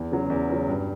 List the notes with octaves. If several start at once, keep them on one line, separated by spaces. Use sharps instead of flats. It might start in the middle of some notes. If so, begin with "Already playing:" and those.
Already playing: E2
C#3 F#3
E2
C#3 F#3
G2